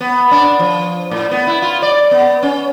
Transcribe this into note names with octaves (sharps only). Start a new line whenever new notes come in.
B3
D4
F3
A2
B3
E4
F4
D5
B3
C#4